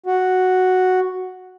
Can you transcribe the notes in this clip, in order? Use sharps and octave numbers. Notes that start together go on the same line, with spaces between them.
F#4